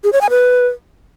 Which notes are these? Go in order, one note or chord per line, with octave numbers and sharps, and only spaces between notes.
G#4
C#5
G#5
B4